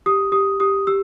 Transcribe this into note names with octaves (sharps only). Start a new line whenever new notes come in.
G4 D#6
G4 D#6
G4 D#6
G4 E6